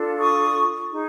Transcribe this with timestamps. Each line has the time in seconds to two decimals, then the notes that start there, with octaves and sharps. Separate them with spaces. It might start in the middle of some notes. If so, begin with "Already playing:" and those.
Already playing: D4 F4 A4
0.18 C#6 D#6
0.91 D#4 G#4